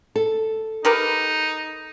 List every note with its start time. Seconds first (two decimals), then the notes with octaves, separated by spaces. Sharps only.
0.16 A4
0.85 D#4 G4 A#4 B4